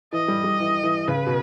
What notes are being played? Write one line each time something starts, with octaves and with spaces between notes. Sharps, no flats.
E3 D#5
G3
G3
E3
E3
C#3 B4
B2